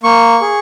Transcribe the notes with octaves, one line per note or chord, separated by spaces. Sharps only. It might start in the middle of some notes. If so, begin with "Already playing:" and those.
A#3 C#6
G#4